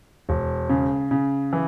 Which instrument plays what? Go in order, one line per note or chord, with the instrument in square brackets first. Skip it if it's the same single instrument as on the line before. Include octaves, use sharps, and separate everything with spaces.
[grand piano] E1
C#3
C#3
E3